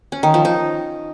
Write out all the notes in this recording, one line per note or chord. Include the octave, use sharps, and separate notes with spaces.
C#4
D#3
F3
D#4